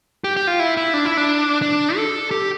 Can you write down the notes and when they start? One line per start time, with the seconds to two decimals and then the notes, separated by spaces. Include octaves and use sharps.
0.24 G4
0.37 G4
0.47 F4
0.59 E4
0.77 E4
0.94 D4
1.05 E4
1.17 D4
1.62 D4
1.96 A4
2.31 G4